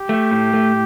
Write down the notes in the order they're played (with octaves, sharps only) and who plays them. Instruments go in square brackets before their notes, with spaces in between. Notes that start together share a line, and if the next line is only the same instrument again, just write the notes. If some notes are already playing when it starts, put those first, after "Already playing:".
Already playing: [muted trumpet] G4
[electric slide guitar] A3
A2
A3